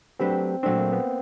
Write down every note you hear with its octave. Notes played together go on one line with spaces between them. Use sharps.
F#3 A3 C4 D4 G4 B4
A#2 F#3 A3 C4 D4
A#3
B3